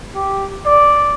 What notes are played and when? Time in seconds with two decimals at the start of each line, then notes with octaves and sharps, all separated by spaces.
0.15 G4
0.66 D5